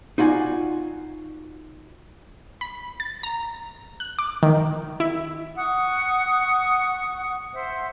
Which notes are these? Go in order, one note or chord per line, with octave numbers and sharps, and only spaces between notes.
D#4 F4 F#4 D5 G#5
B5
A6
A#5
F#6
D6
D#3
E4
F#5 C#6 D#6
C5 E5 F#5 C6